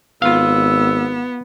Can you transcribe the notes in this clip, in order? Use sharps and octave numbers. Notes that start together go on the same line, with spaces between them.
G#1 B3 F4 F5 E6